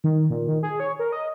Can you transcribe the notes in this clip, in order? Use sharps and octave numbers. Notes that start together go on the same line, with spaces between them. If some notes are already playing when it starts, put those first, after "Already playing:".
D#3
A#2
D#3
G#4
C#5
A#4
D#5